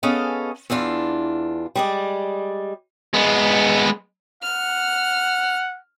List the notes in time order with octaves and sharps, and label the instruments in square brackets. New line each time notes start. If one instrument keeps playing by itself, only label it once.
[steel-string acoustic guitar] B3 C#4 G#4 A4 D#5 F5
E2 E3 D4 F4
G3 G#3 D5
[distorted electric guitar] G#3 B3
[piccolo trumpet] F#5 [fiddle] F6